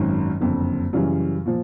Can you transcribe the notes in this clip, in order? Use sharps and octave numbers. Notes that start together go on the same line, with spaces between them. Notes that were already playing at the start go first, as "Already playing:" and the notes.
Already playing: G#1 F#2 D#3
F#1 F2 D3
F#2 C#3 E3 G3
A#2 F3